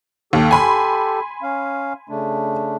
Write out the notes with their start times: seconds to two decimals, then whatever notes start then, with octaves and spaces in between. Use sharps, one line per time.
0.33 D#2 G4 A4
0.51 G#5 B5 C6
1.43 C#4 F5
2.09 C#3 A3 D4